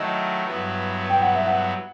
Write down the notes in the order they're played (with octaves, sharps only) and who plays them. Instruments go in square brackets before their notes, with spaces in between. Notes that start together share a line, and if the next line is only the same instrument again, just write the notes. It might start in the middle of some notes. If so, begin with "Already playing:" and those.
Already playing: [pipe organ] D#3 F#3 A3 E4 [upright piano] D#5
[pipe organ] G2 F#3 B3 E4
[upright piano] G5
F#5
E5
F#5